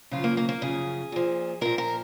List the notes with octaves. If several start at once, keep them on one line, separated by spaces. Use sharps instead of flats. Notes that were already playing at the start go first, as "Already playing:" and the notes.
F#2 C#3 F3 F4
A#3
A#3
A#3
F#2 C#3 F3 G#4
A#2 F3
A#2 F3 A#4
A#4